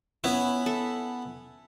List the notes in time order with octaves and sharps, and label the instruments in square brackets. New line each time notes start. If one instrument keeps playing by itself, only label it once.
[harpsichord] B3 E4 [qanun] C#4
[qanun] A4 E5